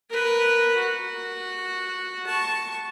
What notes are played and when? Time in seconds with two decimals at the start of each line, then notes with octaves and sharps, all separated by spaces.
0.10 A#4 B4
0.75 F#4
2.27 A5 C#6